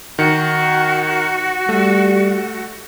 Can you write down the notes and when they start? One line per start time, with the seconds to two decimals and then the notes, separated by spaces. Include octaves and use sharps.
0.19 D#3 F#4 C#7
1.69 G3 A3